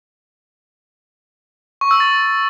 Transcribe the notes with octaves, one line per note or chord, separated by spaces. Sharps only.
C#6
E6
A6